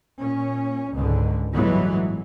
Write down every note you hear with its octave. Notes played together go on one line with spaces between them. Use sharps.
A#2 C#4
C#2 G#2 D3
G1 A2 E3 F#3 G#3 B3